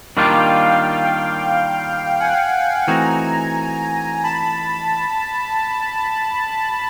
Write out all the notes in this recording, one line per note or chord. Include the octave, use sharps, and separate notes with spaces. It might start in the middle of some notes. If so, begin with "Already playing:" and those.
D#3 G3 A#3 D4 F4 F5 G5
F#5 G#5
E3 A3 C4 D#4 F#4 G#5 A#5
A5 B5